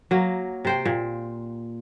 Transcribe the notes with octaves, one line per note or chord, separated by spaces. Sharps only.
F#3 A#3
C3 C5 G5
A#2